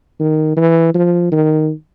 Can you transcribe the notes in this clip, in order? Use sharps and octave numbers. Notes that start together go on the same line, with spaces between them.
D#3
E3
F3
D#3